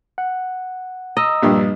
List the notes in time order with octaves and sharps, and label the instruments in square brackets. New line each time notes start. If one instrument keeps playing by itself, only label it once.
[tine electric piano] F#5
[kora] D#5 [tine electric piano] A#5 E6
[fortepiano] A#1 G2 G4